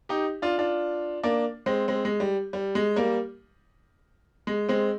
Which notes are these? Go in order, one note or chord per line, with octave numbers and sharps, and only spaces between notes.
D#4 G4
D4 F4
D4 F4
A#3 D4
G#3 C4
G#3 C4
G#3
G3
G3
G#3
G3 A#3
G#3
G#3 C4